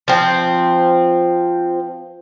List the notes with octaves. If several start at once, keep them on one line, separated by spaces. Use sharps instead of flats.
F3 C4